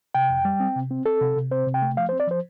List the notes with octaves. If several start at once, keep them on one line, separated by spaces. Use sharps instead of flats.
C3 G5
F2
G3
C4
C3
C4
C4 A4
C3
C3
C4 C5
C3
G5
A3
F3 F5
C5
C4
D5
F3 C5